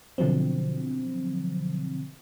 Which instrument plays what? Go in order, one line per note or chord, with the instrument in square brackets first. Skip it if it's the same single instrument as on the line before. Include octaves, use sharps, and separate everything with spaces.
[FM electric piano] B2 D3 F3 F#3 C4